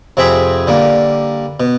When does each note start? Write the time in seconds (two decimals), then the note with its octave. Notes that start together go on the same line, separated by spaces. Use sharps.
0.17 F2 C3 C4 G#4 E5 B5
0.67 D3 G3 A#3
1.60 B2